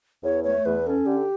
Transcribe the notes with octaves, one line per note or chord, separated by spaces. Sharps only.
E2 C#5
A3 C#5
E2 B4
C#4 A4
D3 G4